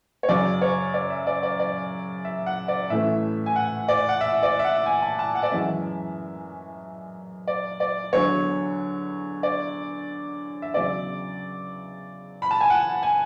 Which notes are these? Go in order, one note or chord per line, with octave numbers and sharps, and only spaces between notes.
C#5
F#2 C#3 F#3 C#4 D5
C#5
D5
E5
D5
D5
D5
E5
F#5
D5
A2 E3 A3 C#4 E5
G#5
F#5
D5
F#5
E5
D5
E5
F#5
G#5
A5
A5
F#5
D5
F#2 E3 G#3 C#4 E5
D5
D5
E2 D3 F#3 C#5
D5
E5
E2 C#3 F#3 D5
B5
A5
G#5
F#5
G#5